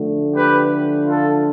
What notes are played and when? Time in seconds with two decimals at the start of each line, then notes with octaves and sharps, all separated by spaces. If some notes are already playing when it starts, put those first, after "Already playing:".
Already playing: D3 F3 A3
0.33 G4 B4
1.05 F4 A4